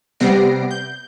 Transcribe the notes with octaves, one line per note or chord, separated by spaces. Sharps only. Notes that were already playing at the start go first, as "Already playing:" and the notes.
C3 G3 B3 A#6 C7 D7
G6